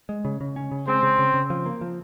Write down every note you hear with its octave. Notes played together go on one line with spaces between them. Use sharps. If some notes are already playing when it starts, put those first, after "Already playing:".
G#3
C#3
C#3
C#4
C#3
G#3 C4
C#3
C#3
C#3
F3
A#3
F3